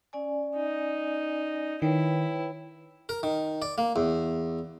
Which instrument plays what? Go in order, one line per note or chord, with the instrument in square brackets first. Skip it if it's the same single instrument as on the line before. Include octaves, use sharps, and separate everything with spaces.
[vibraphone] C#4 D5 G#5
[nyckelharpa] D#4
[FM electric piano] D#3 [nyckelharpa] E4 [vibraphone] B4 C#5 G5
[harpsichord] A#4
D#3
D5
A#3
E2